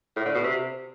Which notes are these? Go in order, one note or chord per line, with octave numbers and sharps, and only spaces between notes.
A2
D3
B2
C3